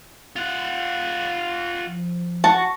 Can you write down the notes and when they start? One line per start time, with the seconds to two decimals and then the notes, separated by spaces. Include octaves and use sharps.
0.36 F4 F#5
1.85 F3
2.44 F#4 A5